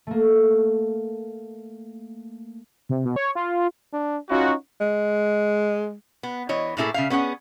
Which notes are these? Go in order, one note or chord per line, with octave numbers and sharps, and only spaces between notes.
A3 A#3
C3
B2
C#5
F4
D4
C#4 D#4 F4 F#4
G#3
B3
E3 C#5 D#5
A2 A3 A#3 E4 G#4 A4
C#3 E5 F5
B3 C#4 G#4 F#5